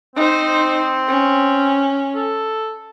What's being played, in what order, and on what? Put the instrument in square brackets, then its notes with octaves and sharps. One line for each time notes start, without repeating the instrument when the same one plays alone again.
[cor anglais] C4 [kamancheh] D#4 C5
[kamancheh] C#4
[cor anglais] A4